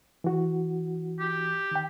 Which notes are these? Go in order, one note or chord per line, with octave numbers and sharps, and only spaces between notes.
E3 F#4
G4
D#3 G5